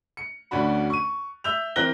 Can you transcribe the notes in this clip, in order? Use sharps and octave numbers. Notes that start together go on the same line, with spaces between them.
C#7
D2 C#4 D4 F#4 B5
C#6 D#7
E5 E6 G6 F7
E3 C4 A#4 F#6 A#6 G7